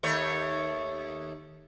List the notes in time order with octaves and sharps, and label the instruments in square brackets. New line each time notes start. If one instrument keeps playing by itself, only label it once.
[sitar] D#2 A3 C#5